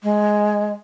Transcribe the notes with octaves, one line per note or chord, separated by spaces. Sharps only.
G#3